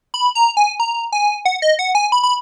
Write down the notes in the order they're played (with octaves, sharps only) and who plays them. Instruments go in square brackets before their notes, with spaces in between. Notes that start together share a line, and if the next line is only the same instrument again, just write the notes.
[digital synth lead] B5
A#5
G#5
A#5
G#5
F#5
D#5
F#5
G#5
B5
B5